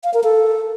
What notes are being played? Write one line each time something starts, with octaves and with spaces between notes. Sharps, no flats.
F5
A#4
A4